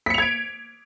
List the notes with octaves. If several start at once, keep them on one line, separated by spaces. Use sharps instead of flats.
G#6 B6 C#7 D7 F7